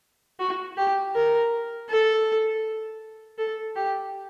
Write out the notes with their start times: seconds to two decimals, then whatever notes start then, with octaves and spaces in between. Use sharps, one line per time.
0.39 F#4
0.78 G4
1.15 A#4
1.89 A4
3.38 A4
3.76 G4